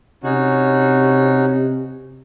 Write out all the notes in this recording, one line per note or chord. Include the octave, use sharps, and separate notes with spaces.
C3 C#4 D#4 F#4